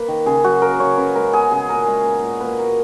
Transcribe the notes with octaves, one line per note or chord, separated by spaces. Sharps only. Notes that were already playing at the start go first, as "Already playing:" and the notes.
Already playing: A#3 B4
D#3
C#3 G#4
F#3 F#4
A#3 A#4
C#3 C#5
C#3 B4
G#3 A#4
B3 G#4
C#3 G#4
A#2 A#4
G#3
B3
A#2
A#3 B4
A#3 A#4